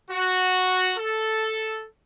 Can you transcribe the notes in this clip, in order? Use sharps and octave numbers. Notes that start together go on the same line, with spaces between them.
F#4
A4